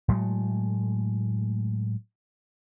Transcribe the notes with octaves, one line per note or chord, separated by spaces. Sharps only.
A2 F#3 G#3 A3